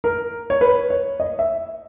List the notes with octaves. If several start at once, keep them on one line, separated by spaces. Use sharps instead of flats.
A#4
C#5
B4
C#5
D#5
E5